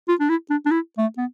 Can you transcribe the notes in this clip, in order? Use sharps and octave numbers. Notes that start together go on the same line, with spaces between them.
F4
D4
E4
D4
D4
E4
A3
B3